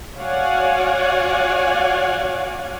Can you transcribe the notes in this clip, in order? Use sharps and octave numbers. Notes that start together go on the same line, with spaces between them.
F#4 C#5 D5 F5 F#5 G#5